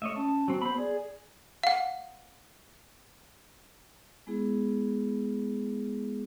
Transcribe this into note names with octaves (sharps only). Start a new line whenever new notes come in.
A3 C#5 D#5 E5
C#4 A5
F#3 C4
B3 C5 B5
G#4 D5
F5 F#5
G#3 B3 E4 G#4